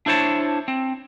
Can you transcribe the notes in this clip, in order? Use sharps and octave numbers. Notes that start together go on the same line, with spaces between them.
D4 E4 C5 C#5 A5
C4